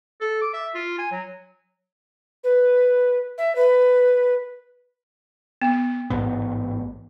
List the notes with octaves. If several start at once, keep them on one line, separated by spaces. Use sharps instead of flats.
A4
D6
E5
F4
G#5
F#3
B4
E5
B4
B3
A1 G#2 B3